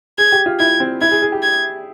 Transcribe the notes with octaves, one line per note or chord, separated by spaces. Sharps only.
G#4 G#6
G4
F4
E4 G#6
C4
E4 G#6
G#4
G#4
G4
G#6